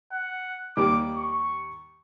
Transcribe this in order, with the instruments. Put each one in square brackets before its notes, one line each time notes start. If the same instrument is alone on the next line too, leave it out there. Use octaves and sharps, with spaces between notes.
[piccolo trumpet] F#5
[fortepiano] D#2 D#3 G3 [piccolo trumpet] D6
[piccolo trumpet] C#6